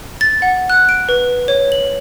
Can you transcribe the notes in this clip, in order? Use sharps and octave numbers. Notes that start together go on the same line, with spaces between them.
A6
F#5
F#6
D7
B4
C#5
F#7